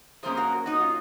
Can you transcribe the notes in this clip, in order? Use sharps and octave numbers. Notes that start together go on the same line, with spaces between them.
F#2 F3 A#3 C#4 G#4 C5
F#4 A#4
D#4 F#4
F4